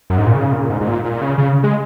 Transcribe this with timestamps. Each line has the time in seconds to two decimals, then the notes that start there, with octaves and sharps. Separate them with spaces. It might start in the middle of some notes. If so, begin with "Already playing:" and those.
0.10 F#2
0.18 G#2
0.27 A#2
0.35 C#3
0.53 A#2
0.70 G#2
0.81 G#2
0.87 A#2
1.04 A#2
1.21 C#3
1.38 C#3
1.64 G#3